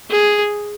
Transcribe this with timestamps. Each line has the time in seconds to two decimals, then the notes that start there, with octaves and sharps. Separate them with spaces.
0.11 G#4